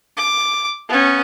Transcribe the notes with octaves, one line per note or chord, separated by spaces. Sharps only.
D6
B3 C#4